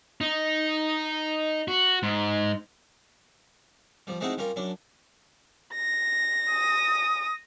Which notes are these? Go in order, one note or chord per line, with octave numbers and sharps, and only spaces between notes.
D#4
F#4
G#2
F3 G3
G#3 A3 C4 D#4 E4 F#4
G3 C#4 F4 A#4
F#2 C#4 D4
A#6
D#6